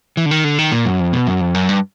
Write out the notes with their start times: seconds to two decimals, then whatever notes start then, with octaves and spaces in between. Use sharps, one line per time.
0.17 E3
0.26 D3
0.31 D#3
0.44 D3
0.58 D#3
0.72 A#2
0.86 F#2
1.00 F2
1.13 B2
1.27 F#2
1.41 F2
1.55 F#2
1.69 G2